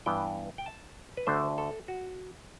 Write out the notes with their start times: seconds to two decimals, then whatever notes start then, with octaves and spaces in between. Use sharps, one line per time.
0.06 G2 E3 B3 G5
0.58 G5
0.66 A5
1.17 B4
1.27 D2 D3 A3 C5
1.58 A4
1.88 F#4